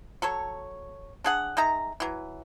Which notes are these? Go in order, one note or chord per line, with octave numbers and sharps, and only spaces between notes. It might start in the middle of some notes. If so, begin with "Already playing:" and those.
F#3 A4 C#5
D4 G#4 F#5
G#3 D#4 E5 A#5
E3 F#3